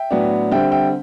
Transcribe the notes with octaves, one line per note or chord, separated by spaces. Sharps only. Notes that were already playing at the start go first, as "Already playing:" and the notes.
Already playing: E5 G5
A2 F#3 B3 D4
D3 G3 C4 E5 G5
E5 G5